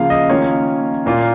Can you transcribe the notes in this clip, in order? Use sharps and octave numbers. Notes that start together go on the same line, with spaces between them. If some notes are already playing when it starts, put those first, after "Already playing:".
Already playing: C#3 F3 A#3 F4 F5
D#5
D#3 A#3 C#4 F4 C#5
A#2 A#3 F4